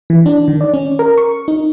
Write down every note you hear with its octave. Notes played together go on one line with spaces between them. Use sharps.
E3
D4
D#3
D5
C#4
A#4
C#6
D#4